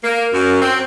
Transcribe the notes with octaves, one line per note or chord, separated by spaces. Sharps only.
A#3
F#2
C4